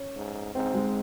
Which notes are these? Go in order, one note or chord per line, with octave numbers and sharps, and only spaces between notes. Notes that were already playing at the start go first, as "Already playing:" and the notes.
Already playing: C#4
G#2
G#2 C4
G#3